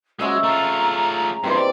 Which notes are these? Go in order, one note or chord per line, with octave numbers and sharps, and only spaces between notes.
C#3 G#3 F#4 E5 C#6
A3 F4 A#5
G2 C3 E3 C5
D5